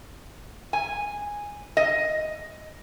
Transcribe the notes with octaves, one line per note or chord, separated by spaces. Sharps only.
G#5
D#5